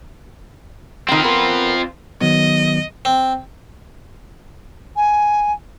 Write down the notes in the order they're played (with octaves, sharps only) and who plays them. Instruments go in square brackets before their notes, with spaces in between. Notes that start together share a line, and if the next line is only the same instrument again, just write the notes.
[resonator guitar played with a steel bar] D#3 G5 [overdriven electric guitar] C4 F4
[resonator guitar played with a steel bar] B3 A#4
[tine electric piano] D#3 F#3 B3 [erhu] D#5
[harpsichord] C4
[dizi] G#5